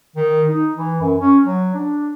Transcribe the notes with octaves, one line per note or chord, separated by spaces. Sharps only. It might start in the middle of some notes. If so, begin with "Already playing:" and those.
D#3
D#4
E3
F#2
C#4
F#3
D4